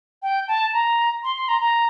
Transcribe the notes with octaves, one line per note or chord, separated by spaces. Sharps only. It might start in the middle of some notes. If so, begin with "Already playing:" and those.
G5
A5
A#5
C6
C6
A#5
A#5